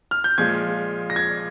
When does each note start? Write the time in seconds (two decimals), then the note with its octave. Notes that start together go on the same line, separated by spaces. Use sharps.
0.11 F6
0.24 G6
0.38 A#2 F3 G#3 G#6
1.10 A#6
1.16 G#6